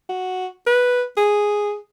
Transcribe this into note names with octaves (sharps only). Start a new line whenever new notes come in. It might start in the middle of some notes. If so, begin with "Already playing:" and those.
F#4
B4
G#4